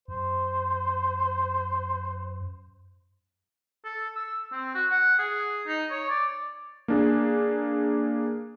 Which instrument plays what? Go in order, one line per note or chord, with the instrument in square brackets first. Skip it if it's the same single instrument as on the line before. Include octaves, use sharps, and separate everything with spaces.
[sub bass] F#2 [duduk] C5
[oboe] A4
E6
C4
F#4
F#5
G#4
D#4
C#5
D5
[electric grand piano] A#3 D4 G#4